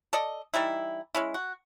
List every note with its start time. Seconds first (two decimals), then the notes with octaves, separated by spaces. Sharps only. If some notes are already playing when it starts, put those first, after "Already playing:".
0.13 A4 D5 D#5
0.54 E3 G3 D#4 E4
1.15 G#3 C#4 E4
1.34 F#4